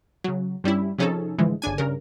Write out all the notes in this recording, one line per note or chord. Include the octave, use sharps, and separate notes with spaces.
C#3 F#3
G2 G3 C#4 E4
C3 F3 C#4 D#4 G#4 A4
A2 D3 E3 F3 G#3
G1 C#3 D4 G#5
G2 C#3 A#4